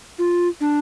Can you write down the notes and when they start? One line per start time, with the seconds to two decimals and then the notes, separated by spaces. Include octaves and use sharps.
0.19 F4
0.61 D4